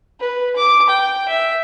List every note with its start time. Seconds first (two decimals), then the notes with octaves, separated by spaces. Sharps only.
0.20 B4
0.56 D6
0.89 G5
1.28 E5